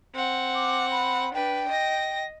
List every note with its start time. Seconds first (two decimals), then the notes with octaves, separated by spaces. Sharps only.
0.15 C4 F#5
0.55 D6
0.91 B5
1.34 D4 B4 G5
1.69 D#5 A#6